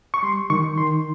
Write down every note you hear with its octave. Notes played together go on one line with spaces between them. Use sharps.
C#6
G3 C6
D#3 C#6
D#3 C6